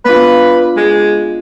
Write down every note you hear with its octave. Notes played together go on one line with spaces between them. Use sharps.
B3 D4 F4 B4
G#3